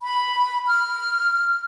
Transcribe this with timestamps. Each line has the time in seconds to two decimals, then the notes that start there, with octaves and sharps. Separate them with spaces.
0.03 B5
0.66 F6